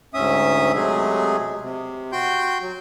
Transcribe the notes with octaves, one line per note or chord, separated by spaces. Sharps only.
D2 G#2 C#4 E5 D#6
C3 F#3 G#3 A3 G#4
C3
F#4 G5 C6 G6
F#3